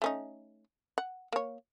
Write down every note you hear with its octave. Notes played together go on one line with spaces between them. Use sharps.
A3 C#4 D#4
F#5
A#3 C#5